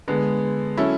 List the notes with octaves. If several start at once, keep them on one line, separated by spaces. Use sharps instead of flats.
D3 G#3 B3
F#3 C#4 E4 A4